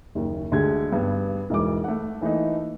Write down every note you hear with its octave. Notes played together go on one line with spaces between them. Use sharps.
F#1 D#2
D2 D3 G#3 G4 G#6
G2 B3
E1 G#2 E3 D6
A3 F#5
E3 A3 A#3 D#4